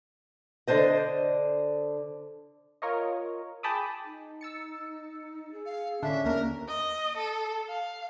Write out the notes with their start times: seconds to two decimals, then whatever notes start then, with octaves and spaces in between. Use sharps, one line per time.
0.68 D3 D4 C5 D#5
2.82 F4 A#4 C#5 D#5
3.63 G#4 G5 A5 B5 D6 D#6
4.04 D#4
4.41 E6 A6 C#7
5.52 G#4
5.66 F5
6.03 A2 D3 C#4 D4 E5
6.24 D#2 A#3 D4 A#4
6.68 D#5
7.17 A4
7.69 F5